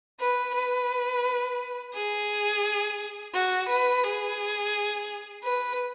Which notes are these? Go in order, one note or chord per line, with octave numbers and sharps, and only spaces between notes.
B4
B4
G#4
F#4
B4
G#4
B4